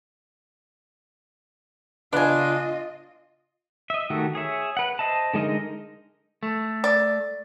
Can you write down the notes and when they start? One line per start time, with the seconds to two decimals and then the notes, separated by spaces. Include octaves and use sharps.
2.13 C#3 B3 D4 F4 D#5 G#5
3.90 D#5 E5
4.10 D#3 A3 F#4 G4
4.35 G#4 C#5 E5
4.77 B4 F#5
4.99 C5 D#5 E5 A5
5.34 D3 G#3 D#4 A#4 D#5
6.43 A3
6.84 D5